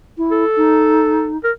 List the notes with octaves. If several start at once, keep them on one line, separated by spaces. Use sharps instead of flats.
E4
A4
D#4
A#4